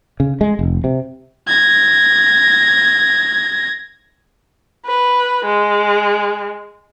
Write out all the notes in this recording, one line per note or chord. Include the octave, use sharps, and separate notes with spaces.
C#3
G#3
F1
C3
G#6 A#6
B4
G#3